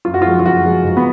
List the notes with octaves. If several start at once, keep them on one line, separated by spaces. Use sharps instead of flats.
F#2 F4
F#4
F4
F3 G#3
F4
F#2 F#4
F3 G#3
G#2
B3